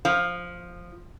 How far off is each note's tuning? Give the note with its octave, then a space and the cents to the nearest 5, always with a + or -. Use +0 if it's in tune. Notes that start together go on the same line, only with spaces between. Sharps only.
F3 +5 F5 +5